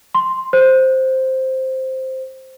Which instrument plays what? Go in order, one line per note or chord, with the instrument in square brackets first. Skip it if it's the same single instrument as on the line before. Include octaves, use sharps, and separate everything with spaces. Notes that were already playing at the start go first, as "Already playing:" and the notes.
[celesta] C6
C5